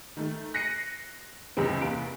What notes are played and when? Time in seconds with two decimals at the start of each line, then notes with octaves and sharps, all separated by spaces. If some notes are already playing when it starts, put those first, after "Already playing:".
0.17 D#3 A3
0.54 F#6 A#6 C7 C#7 D#7
1.57 C#2 F#2 C3 E3 G#3 C4
1.81 E2 C3 A#3 B4 D7